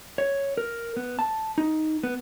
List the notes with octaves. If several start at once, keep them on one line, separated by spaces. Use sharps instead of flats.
C#5
A#4
B3
A5
D#4
B3